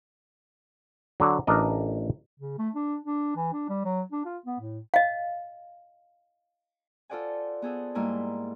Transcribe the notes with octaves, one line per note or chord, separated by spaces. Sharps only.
D3 F#3
A1 D4 A#4 D#5
C#3
A3
D4
D4
E3
D4
G3
F#3
D4
F4
B3
A2
D#5 F5
F4 A4 C5 D5 F#5 G#5
B3 G#4 A4 C5
G#2 G3 A#3 E4 G#5 C6